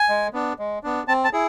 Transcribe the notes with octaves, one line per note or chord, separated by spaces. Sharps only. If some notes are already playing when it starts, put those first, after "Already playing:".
Already playing: G#5
G#3
B3 D4
G#3
B3 D4
C4 A5
A5
E4 G#4